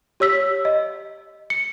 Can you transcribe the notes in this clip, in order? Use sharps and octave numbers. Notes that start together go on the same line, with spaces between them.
G4 C#5 E6 B6
D#5
C#7